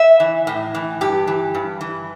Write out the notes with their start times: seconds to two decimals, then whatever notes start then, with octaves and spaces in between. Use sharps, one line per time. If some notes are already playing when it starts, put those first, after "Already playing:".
Already playing: E5
0.20 E3
0.47 A2
0.75 E3
1.01 G2 G4
1.27 E3
1.55 G2
1.81 E3